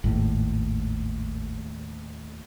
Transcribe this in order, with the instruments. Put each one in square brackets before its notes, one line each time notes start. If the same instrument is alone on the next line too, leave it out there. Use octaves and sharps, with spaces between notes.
[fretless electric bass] G#1 [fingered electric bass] D#2 A2